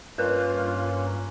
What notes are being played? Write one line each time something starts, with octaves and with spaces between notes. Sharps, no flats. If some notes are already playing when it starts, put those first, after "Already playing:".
G2 A#3 C#4 F4 A#4 B4 F#6